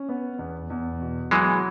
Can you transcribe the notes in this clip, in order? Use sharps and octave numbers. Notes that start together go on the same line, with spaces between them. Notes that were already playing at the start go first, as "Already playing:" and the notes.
Already playing: C#4
B3
E2
E2
B2
E3 F#3 G#3